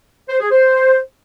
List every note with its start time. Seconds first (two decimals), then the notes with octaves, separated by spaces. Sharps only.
0.29 C5
0.40 G#4
0.51 C5